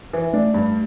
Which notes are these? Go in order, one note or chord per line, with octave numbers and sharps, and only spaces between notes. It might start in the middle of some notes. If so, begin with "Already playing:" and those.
E3
A3 D4
G2